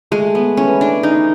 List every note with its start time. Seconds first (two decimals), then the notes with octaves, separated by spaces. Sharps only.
0.11 G#3 A3
0.35 B3
0.57 E3 C#4
0.81 D4
1.03 C#3 D#4